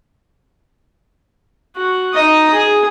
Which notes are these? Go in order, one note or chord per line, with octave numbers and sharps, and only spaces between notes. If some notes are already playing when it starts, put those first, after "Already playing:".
F#4
D#4 D#5
G#4